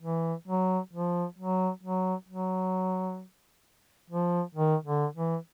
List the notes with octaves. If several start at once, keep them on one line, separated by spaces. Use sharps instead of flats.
E3
F#3
F3
F#3
F#3
F#3
F3
D#3
D3
E3